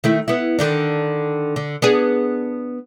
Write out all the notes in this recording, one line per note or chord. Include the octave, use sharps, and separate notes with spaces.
D#3 A3 E4
B3 E4
D3 D#3 D4
D3
B3 D4 G#4